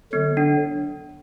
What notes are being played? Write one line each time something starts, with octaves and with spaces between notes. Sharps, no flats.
D3 F#3 B3
D4